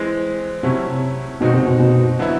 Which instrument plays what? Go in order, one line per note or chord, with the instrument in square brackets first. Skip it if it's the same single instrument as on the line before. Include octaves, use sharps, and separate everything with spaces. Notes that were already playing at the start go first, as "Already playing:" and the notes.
Already playing: [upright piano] E3 G#3 C4
[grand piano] C3 [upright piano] F#3 A3 C#4 E4
[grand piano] B2 [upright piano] D#3 G#3 C4 D#4 F#4
[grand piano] C3
B2
B2
[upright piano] D3 F#3 B3 E4